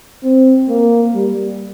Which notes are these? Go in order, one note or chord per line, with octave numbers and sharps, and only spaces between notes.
C4
A#3
G3